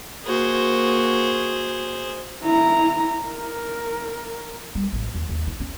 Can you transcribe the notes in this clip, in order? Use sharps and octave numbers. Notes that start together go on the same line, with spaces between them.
A#3 F#4 G#4 C5
E4 A#5
A#4
G3
A1 F#3
D#2
D#2
E4
C#4